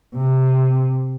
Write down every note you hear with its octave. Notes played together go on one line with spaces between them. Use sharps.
C3